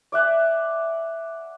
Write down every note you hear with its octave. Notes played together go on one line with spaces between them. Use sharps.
D5 E5 F#5 G#5